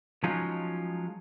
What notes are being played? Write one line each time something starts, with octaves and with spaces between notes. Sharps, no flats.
F3 F#3 G#3 C#4 D#4 F4